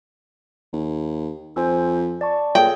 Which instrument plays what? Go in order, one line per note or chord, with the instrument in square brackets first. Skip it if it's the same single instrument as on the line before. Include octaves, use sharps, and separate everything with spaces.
[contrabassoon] D#2
[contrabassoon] F2 [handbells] C5 G#5 E6
[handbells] D5 A5 C#6
[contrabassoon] A#2 [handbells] G#4 A4 C#5 [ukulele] G5